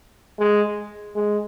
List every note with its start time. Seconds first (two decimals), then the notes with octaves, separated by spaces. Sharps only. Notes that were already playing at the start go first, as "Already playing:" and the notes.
0.39 G#3
1.15 G#3